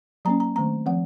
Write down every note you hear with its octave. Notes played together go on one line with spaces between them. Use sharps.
F#3 A#3 C#4 A#5
A#5
D#3 A3 C4 A#5
F3 C4 F#5